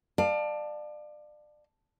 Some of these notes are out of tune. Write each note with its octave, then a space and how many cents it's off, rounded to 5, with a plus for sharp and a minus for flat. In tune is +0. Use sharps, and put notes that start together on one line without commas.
D5 +30 F5 +0 A5 +0